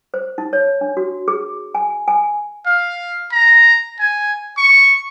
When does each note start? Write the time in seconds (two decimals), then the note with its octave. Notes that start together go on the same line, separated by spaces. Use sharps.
0.14 C5
0.38 D#4
0.53 C#5
0.81 D4
0.97 F#4
1.28 G#4
1.75 G#5
2.08 G#5
2.66 F5
3.32 A#5
4.00 G#5
4.57 C#6